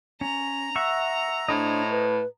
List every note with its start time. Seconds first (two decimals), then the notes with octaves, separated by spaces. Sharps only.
0.21 C#4 A#5
0.76 E5 F#5 C#6
1.48 A2 D4 C5 C#5 D#5
1.90 B4